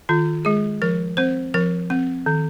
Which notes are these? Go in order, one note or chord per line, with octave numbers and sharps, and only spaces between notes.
D#3 F4
G#3 G#4
F3 A#4
C4 C5
F3 A#4
C4
D#3